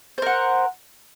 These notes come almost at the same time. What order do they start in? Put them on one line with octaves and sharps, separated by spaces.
C5 A#4 F#5